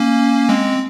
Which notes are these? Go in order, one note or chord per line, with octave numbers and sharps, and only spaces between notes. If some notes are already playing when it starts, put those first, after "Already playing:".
Already playing: A#3 C#4
G#3 C4